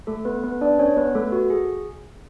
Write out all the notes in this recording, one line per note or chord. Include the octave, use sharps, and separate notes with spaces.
A3 A4
B3 B4
B3 B4
D4 D5
C#4 C#5
B3 B4
A3 A4
F#4
G#4